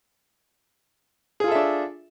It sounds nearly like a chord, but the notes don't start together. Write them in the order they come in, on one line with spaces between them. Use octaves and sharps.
G#4 F4 A4 E5 D4